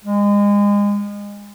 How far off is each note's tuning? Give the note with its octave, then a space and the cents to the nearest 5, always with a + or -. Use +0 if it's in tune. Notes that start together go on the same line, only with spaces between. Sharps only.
G#3 -30